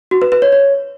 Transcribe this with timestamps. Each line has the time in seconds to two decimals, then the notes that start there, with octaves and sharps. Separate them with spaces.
0.11 F#4
0.22 B4
0.32 B4
0.42 C#5
0.52 C#5